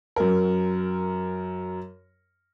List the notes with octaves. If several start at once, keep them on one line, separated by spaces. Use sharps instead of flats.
F#2 A#4